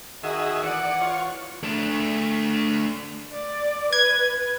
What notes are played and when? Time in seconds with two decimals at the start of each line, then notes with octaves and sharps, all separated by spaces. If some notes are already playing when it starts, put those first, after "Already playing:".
0.23 D#3 F#4 G#4 D#5 E5
0.62 E3 D5 F#5
1.01 F4 C#5
1.63 A3 D4
3.32 D5
3.93 B4 G#6